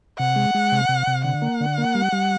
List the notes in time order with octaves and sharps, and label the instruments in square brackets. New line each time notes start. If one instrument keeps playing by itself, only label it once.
[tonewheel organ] C3 [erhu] F#5
[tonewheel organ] G#3
G#3
C3
C3
C3
[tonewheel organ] D3 [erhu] F#5
[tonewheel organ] A#3
D3
A#3
G3
G3